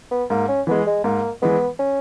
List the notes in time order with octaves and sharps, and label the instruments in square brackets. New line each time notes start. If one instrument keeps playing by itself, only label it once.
[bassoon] B3
[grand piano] G#2 [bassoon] A#3
[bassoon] C#4
[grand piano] E3 G#3 [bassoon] B3
[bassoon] G#3
[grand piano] G#2 [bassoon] A#3
[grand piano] E3 G#3 [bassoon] B3
[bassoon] C#4